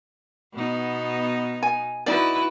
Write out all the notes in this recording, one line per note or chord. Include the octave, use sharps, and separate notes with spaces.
B2 B3 D#4
G#5
D#4 E4 F#4 B4 D5